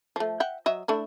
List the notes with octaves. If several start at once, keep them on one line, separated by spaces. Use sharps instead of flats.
F3 A3
E5 F#5 G5
F#3 D#5 E5
A3 D4 E4